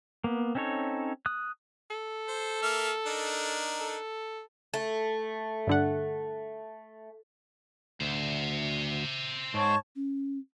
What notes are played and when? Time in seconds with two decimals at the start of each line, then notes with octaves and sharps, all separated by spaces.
0.24 A#3 B3
0.55 C4 C#4 D#4 A4 C#5
1.26 D#6 F#6
1.90 A4
2.28 C5
2.62 A#3 E5 F6
3.06 D4 D#4 A#4
3.80 A4
4.74 A3
5.67 G2 D3 F#5
8.01 D2 C5 E5
9.54 G#2 C#5 A5 C#6
9.96 C#4